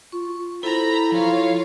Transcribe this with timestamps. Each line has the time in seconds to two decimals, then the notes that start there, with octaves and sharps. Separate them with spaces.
0.12 F4 C#6
0.63 E4 A4 C5 A#5 B5
1.12 F3 F4 C#5 F5